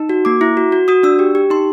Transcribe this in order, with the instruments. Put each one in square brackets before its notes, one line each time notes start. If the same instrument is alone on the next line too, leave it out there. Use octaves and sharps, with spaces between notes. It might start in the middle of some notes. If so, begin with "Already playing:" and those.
Already playing: [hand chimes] D#4
F#4
A#3 D6
E4
F#4
F#4
F#4 D#6
D4 E6
G4
G4
D#4 C6